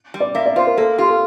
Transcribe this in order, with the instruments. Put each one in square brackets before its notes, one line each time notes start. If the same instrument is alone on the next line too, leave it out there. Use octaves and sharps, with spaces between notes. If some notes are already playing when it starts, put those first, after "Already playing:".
[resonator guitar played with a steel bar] G3
[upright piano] D5
[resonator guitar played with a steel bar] A#3 [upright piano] E5
[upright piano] D5
[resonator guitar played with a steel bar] F4 [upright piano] C5
[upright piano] A#4
[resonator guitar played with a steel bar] A#3 [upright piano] A4
[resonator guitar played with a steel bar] F4 [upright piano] G4
[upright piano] A4